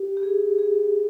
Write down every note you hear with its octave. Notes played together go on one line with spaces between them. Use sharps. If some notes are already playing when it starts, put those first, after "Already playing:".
Already playing: G4
G4
G#4
G#4